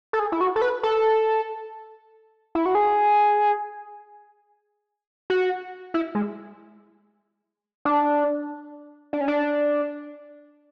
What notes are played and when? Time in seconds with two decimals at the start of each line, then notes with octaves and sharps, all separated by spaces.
0.13 A4
0.19 G#4
0.32 E4
0.41 F#4
0.56 A4
0.62 B4
0.83 A4
2.55 E4
2.66 F#4
2.75 G#4
5.30 F#4
5.94 E4
6.15 G#3
7.85 D4
9.13 D4
9.21 C#4
9.28 D4